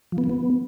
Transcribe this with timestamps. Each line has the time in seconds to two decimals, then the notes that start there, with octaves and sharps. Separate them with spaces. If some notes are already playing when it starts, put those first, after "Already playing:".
0.12 F3
0.18 B3
0.24 F3
0.29 B3